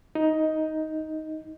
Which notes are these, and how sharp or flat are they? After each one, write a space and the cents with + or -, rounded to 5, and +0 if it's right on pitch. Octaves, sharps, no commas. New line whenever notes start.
D#4 +10